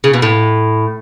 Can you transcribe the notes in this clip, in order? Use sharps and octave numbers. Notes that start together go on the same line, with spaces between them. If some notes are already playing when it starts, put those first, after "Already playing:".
C#3
B2
A2